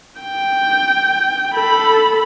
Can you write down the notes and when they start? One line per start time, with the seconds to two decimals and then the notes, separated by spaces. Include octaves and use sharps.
0.21 G5
1.54 A4 B5